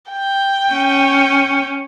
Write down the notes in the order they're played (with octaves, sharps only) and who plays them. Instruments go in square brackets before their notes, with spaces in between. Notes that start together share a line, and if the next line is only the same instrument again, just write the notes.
[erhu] G5
[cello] C#4